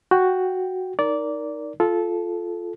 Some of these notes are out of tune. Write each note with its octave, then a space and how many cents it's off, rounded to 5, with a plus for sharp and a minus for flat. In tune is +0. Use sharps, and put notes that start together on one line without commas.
F#4 +0 G5 +0
D#4 +0 A#4 +0 D5 -15
F4 +0 A4 -15